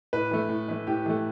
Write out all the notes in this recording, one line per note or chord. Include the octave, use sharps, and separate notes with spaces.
A2 B4
E3 A3
A2
E3 A3
A2 G4
E3 A3